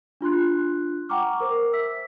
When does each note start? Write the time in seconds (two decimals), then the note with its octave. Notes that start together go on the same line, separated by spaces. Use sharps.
0.21 D4 F4 C6 F#6
1.09 F#5 G5 A#5 C#6 D6 F6
1.40 A#4 C5 D6
1.73 E5 E6 B6